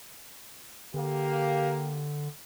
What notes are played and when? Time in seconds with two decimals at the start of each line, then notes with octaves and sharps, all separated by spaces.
0.94 D3 A#3 G4